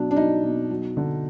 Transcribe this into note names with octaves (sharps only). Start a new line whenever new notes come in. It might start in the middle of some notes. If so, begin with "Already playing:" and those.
Already playing: B2 F#3 D4
D4
F#3 D#4
B2
F#3
D3